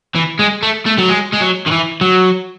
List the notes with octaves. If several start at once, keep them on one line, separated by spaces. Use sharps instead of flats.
E3
G#3
A3
A3
F#3
G#3
G#3
F#3
D#3
E3
F#3